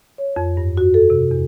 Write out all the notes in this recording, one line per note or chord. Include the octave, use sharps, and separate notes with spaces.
C#5
F2
G2
F#4
A4
C3
E2